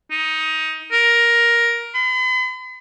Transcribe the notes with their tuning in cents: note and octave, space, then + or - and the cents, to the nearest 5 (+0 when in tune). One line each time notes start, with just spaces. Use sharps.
D#4 +20
A#4 +10
B5 +45